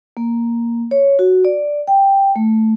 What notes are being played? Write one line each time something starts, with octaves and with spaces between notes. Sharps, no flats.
A#3
C#5
F#4
D5
G5
A3